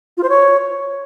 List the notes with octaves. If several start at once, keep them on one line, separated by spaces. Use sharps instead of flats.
F4
C5
C#5